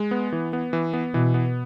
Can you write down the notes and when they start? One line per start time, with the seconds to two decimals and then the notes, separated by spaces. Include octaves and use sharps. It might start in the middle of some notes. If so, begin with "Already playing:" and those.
Already playing: G#3
0.11 B3
0.33 E3
0.53 B3
0.73 E3
0.93 B3
1.13 B2 E3
1.34 B3